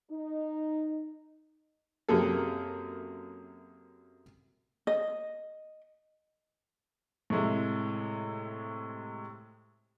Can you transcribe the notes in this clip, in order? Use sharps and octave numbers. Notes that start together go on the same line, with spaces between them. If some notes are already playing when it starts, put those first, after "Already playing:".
D#4
F#2 C3 A#3 G#4 A4
D#5
A2 C3 G#3 E4